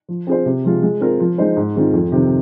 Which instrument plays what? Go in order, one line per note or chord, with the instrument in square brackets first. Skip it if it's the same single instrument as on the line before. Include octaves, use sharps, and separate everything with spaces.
[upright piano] F3
C4 F4 G#4 C5
C3
F3 G#3 F4
G#3
C4 F4 A#4
F3
G#3 D#4 C5
G#2
D#3 G#3 C4 F4
F2
C3 D#3 C4